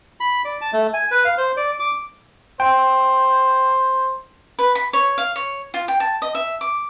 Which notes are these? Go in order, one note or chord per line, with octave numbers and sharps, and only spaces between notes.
B5
D5
A5
A3
G#5
B4
F5
C5
D5
D6
C5 G5
B4
B5
C#5
F5
C#5
F4
G5
A5
D#5
E5
D6